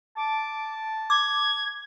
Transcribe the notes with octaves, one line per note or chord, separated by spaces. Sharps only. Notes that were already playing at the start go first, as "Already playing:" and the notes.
A5 D6
D6 G#6